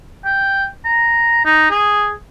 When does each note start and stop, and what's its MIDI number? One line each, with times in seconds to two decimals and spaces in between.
0.25 0.65 79
0.85 1.41 82
1.45 1.67 63
1.71 2.12 68